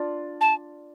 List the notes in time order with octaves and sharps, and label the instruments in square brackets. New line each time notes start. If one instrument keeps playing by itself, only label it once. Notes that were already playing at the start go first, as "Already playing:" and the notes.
Already playing: [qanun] D4 F4
[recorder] A5